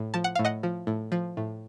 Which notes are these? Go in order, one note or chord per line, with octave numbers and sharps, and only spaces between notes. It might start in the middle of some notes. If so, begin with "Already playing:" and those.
Already playing: A2
F3 A5
F#5
A2 F5
D#5 F#5
F3
A2
F3
A2